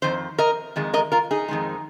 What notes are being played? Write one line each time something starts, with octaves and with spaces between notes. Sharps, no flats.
F2 D#3 C5
A#4 D#5
F2 D#3 G#3
A#4 D#5
F4 A#4
D#4 G#4
F2 D#3 G#3